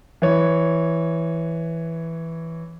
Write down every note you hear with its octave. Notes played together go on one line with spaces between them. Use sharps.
E3 C#5